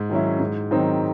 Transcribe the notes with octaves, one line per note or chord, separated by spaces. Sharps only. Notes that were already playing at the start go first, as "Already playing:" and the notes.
Already playing: G#2
D#3 F#3 C#4 E4
G#2
D#3 F#3 C4 D#4